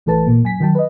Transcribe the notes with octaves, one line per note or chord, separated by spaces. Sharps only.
A1 E3 A3 A4 B4 A5
A#2 A#3
F#2 G#5 B6
D#3 F#3 G5 A5
B4 D#5